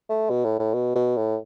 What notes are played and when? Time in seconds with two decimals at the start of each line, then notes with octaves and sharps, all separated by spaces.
0.09 A3
0.30 B2
0.45 A2
0.59 A2
0.74 B2
0.96 B2
1.17 A2